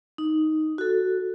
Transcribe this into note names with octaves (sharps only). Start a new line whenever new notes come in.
D#4
F#4 A4